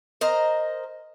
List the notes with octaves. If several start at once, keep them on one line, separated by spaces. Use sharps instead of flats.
A#4 C5 D#5 A#5